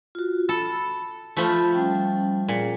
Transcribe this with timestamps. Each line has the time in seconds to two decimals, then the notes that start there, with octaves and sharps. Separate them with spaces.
0.15 F4 F#4
0.49 A4 B5
1.37 F3 A3 F4 B5
1.74 G3 C#4 G5
2.48 A#2 G#4